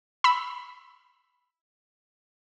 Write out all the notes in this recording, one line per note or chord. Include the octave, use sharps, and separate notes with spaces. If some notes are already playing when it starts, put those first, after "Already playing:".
B5 E6